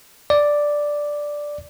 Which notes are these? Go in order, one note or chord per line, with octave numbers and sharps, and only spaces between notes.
D5